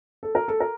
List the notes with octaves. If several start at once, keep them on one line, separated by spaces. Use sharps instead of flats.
A4
A#4
A4
A#4